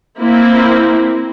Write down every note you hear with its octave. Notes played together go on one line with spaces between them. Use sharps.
A#3 C4 E4